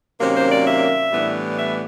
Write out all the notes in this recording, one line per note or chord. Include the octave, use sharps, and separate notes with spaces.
C3 D#3 F#3 A#3 C#4 C5
C5
D5
E5
A2 E3 G3 B3 D4
E5